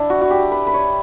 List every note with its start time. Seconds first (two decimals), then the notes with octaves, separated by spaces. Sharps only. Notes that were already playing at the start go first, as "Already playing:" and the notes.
Already playing: D4 E4
0.10 F#4
0.21 F#4
0.30 G4
0.52 B4
0.67 B4
0.74 C#5